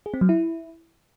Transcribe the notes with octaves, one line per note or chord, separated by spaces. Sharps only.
G#4
C4
F#3
E4